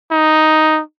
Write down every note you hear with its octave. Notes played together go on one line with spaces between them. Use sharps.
D#4